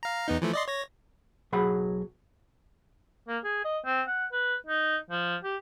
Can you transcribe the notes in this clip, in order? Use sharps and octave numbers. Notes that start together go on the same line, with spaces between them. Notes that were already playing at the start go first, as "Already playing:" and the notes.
F5 A#5
E2 B3 D#4
E3 F3 A3
D5 D#5 C6
C#5 A#6
B1 F#3 G#4 F#5 B5
A#3
G#4
D#5
C4
F#5
B4
D#4
F3
G4